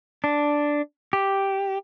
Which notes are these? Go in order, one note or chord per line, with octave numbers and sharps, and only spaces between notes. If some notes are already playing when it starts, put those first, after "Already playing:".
D4
G4